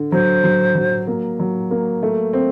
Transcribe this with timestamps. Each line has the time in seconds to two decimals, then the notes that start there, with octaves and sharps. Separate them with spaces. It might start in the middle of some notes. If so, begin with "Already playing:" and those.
Already playing: D3
0.12 F#3 C5
0.43 F#3
0.75 F#3
1.07 A#3
1.40 F#3
1.71 A#3
2.03 A3
2.33 C4